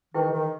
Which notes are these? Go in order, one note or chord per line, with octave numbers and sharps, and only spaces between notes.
D#3 E4 G#4 B4 G5 C#6
D#3